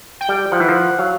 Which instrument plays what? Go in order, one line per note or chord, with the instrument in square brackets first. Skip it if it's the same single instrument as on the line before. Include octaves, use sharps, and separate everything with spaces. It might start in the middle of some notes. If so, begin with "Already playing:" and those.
[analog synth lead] G5
[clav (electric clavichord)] G3
[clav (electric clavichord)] F3 [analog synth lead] F#5
[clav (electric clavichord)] E3
F3
[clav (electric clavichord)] F#3 [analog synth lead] F5